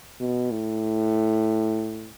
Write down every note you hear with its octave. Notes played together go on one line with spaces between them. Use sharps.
B2
A2